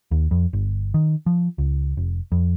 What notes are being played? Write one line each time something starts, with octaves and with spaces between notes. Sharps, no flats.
D#2
F2
G1
D#3
F3
C#2
F1
F2